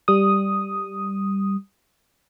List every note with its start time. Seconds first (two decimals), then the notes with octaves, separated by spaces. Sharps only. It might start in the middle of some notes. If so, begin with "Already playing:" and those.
0.08 G3 D#6